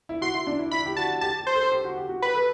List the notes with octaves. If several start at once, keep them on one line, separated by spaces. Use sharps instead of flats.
E4
F#4 C6
E4
D4
E4
E4 B5
G4
F#4 A5
G4 A5
G4
C5
A4
G4
F#4
G4
F#4
G4 B4
A4